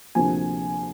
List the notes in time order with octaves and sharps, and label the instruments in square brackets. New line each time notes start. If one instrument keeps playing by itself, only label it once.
[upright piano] D2 C3 F3 A#3 G#5